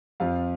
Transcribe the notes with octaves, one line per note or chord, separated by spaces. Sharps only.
F2 F3 F5